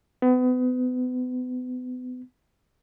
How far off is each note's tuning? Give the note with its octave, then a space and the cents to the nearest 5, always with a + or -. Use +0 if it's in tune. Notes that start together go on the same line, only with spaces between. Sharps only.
B3 +35